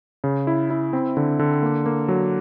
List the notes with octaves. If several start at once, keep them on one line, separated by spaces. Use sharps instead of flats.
C#3
E4
E4
C4
D3
D3
A#3
A#3
F#3